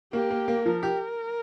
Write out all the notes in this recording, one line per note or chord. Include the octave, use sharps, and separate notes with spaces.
A#3 G4
A#3
A#3
F3 A#4
G4